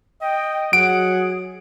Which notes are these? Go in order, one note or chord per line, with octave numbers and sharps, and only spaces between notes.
D#5 G5
F#3 G#4 F#5 D7